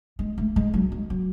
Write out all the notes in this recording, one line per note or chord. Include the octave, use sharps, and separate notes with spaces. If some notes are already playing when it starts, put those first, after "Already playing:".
G#3
A3
G#3
F#3
G#3
F#3